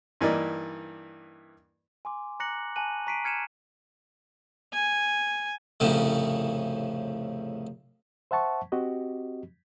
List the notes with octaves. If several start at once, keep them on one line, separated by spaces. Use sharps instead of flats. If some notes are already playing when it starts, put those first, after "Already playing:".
G2 E3 A#3 D#4 D5
G#5 C6 D6
A#5 D6 F#6 A#6 C#7 F#7
G#5 A5 C#6 F#6 D#7 F#7
A#5 C#6 B6 C7 D7 D#7
F6 G#6 C#7 D#7 E7
G#5
C2 F2 A2 C#3
C5 E5 F#5 A5 C#6
C4 F#4 G4 D#5